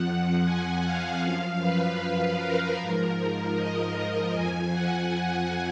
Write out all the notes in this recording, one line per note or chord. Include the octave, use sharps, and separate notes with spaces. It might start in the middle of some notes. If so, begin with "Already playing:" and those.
Already playing: F2 F3 F#5
G#5
F5
F#2 F3
B4
A#4
G#2 F3 A#4
D#5
F2 F3 G#5
F#5